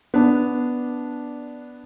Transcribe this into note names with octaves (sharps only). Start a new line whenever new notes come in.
B3 D4